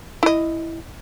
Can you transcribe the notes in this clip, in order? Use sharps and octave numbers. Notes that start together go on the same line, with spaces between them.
E4 D#5